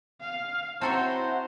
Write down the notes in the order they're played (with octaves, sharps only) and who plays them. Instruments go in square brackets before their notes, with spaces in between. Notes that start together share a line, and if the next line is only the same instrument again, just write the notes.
[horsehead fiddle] F5
[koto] C4 A4 C#5 [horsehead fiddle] E4 F#4 [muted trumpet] C5 [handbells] A5 A#5